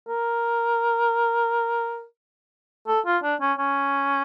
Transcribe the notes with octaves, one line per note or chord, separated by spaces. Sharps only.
A#4
A4
F4
D4
C#4
C#4